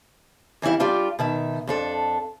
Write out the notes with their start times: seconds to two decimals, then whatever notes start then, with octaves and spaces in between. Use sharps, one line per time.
0.62 E2 E3 G3 E4 F5
0.80 G3 D4 F4 G4 D5
1.19 B2 D#3 E5
1.67 F2 D4 A4